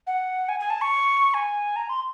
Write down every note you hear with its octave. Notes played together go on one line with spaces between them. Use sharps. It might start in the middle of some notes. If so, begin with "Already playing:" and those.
F#5
G#5
G#5
A5
C#6
G#5
A#5
C6